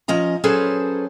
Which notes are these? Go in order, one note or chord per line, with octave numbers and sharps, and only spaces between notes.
F3 C#4 D#5 A#5
F#3 C#4 G#4 A4 B4 C5